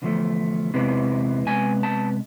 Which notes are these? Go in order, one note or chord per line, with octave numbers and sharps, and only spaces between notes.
E2 D3 F3 A3
E2 C3 E3 G#3 B3
C3 G#3 B3 G#5
A5